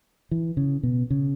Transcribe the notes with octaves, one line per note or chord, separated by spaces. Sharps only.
E3
C#3
B2
C#3